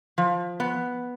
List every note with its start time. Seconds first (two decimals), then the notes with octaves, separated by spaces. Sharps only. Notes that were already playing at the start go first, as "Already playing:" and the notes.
0.18 F3
0.60 B3